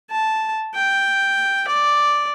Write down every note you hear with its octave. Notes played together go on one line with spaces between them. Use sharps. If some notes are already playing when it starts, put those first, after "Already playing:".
A5
G5
D5